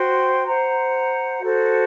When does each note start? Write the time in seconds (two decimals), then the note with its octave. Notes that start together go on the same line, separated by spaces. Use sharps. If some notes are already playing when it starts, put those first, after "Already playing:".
Already playing: F#4 C5 G5 C6
0.47 C5 F#5 A#5
1.41 F#4 A4 C5